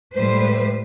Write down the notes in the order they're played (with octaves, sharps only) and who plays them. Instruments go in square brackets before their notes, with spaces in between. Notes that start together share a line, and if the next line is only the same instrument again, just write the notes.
[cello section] A2 G3 G#3 B4 C5